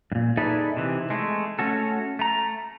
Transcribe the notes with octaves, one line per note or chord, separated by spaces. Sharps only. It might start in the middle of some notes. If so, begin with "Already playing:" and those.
G2 A#2
D#4 G#4 A4 B4 D5 E5
C3 E3
G#3 A3
A3 C#4 F#4 A4
A3 A#5